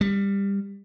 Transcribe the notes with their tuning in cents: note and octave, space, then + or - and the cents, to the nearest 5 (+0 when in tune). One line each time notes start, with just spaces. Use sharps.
G3 +20